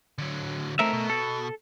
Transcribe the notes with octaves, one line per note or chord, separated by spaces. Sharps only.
D3 F#3
A3 C4 D#4 A#4 E5
B2
A4